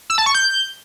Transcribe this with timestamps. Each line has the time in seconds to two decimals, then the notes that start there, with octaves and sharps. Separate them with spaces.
0.10 E6
0.18 A5
0.26 C#6
0.35 G6